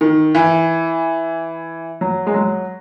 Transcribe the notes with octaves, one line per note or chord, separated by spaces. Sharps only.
D#3
E3
F#3
G#3
F#3